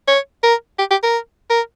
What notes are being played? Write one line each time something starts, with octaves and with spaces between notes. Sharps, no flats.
C#5
A#4
G4
G4
A#4
A#4